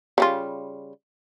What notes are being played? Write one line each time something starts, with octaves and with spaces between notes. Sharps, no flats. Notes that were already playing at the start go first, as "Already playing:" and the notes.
C#3 G3 F4